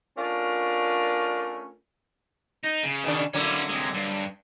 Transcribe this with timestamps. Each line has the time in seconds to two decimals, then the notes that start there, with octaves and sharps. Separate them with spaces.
0.17 A3 C#4 D4 F4 A#4
2.64 D#4
2.83 C#3
3.04 B2 D#3 D4
3.34 D3 F#3 A#3 C#4 E4
3.69 C3 G#3
3.94 G2